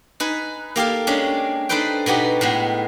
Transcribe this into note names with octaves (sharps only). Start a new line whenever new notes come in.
D#4 B4 G#5
A#3 G4 A4 F5
G#3 C#4 D4 G4
D4 D#4 A4 B4 C5 G5
B2 B3 D#4 G4
A2 G#3 B3